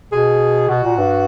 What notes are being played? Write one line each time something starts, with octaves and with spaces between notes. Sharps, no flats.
B2 G#4
B2 F#4
A#2
G2